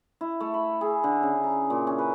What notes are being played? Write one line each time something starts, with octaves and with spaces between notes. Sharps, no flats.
E4
A3
B5
G#4
D3
C#3
A#5
A#2
C#4
B4